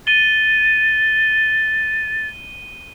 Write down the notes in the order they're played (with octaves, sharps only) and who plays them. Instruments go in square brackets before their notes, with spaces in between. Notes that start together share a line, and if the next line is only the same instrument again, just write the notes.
[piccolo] A6 [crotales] D#7 G7